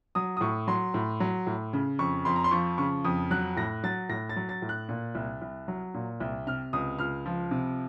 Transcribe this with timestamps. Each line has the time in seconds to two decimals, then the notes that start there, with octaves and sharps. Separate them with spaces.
0.15 F#3 D#6
0.37 D#6
0.41 A2 C#6
0.67 F#3 C6
0.94 A2
1.20 F#3
1.47 A2
1.73 C#3
1.99 F2 C#6
2.25 F2 C6
2.36 A#5
2.44 C6
2.51 F3 C#6
2.78 C#3 C#6
3.04 F2 D#6
3.31 F#3 F#6
3.57 A2 A#6
3.83 F#3 A6
4.09 A2 A#6
4.29 A6
4.36 F#3
4.49 A6
4.62 A2
4.69 F#6
4.89 A#2
5.15 C2
5.41 C2
5.68 F#3
5.94 A#2
6.20 C2
6.47 C3 F6
6.73 C#2 D#6
6.99 C#2 F6
7.26 F3
7.51 C3